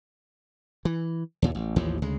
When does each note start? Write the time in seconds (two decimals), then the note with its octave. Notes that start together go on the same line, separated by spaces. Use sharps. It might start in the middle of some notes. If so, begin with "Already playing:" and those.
0.85 E3
1.42 D#2 A#2
1.55 A1
1.76 A1 D#2 E3 F3
2.02 D2 C#3 G#3